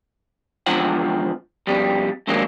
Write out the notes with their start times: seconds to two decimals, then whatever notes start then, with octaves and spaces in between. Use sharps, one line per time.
0.66 E2 G#2 D3 F3 C4 F#5
1.67 F2 B2 G3
2.27 F2 G#2 D#3 F#3 A#3 D4